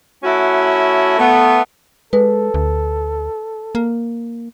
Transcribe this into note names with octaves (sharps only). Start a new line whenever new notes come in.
A3 C#4 E4 F#4
A3 B3
G#3 A4 B4
D2
A#3